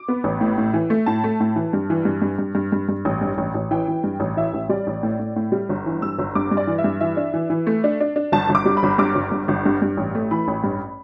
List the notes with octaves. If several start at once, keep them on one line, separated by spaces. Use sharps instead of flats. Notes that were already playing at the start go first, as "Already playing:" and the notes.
Already playing: D6
B3
A1
A2
A2
E3
A3
A2 A5
A3
A2
E3
G2
E3
G2
G2
G2
G2
G2
G2
A1
G2
A1
A1
E3 G5
E3
G2
A1
E3 E5
A1
G3 D5
A1
A2
A2
A2
G3
G1
E3
G2 E6
G1
G2 D6
G2
D5
E3
E5
G2
E3 E5
D4
E3
E3
A3
D4
D4
D4
G1 A5
G1
D6
G3
B5
G1
G2 D6
G1
G2
G1
G2
G2
A1
A3
E3 B5
A1
G2